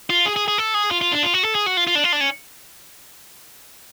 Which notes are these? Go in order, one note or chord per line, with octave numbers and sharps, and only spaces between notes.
F4
G#4
G#4
G#4
A4
G#4
F4
F4
D4
F4
F#4
A4
G#4
F#4
F4
F4
D4
F4
D4
C#4